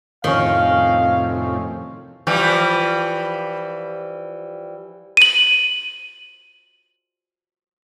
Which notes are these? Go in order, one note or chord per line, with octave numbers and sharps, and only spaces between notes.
F2 A2 C3 D#3 C#4 D#5 F5
E3 F3 G3
D#7 F#7